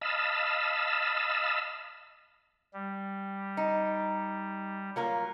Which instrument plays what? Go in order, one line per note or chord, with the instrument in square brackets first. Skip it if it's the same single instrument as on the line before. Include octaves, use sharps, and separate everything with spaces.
[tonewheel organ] D#5 F5 A5 B5 E6
[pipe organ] G3
[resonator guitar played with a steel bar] D#4
F#3 A#3 F4